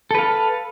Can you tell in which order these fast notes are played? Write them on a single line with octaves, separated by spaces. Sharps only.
A4 B4 F5